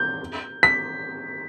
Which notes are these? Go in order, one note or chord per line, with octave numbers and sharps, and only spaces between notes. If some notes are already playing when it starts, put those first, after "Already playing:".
Already playing: G6
B6